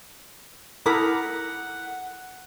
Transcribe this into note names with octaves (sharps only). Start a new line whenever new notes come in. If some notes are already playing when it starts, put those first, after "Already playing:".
E4 A4 A#4 F#5 B5 D6 D#6